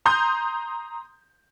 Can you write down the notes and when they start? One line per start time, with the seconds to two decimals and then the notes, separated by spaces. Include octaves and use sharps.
0.06 A#5 C6 D#6 G6